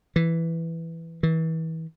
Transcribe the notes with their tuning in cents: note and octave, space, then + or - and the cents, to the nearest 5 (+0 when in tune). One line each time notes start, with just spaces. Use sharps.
E3 +5
E3 -35